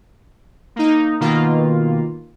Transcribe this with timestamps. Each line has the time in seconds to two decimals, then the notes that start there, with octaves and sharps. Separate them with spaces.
0.76 A#3 D#4
1.20 B2 D#3 A#3 F4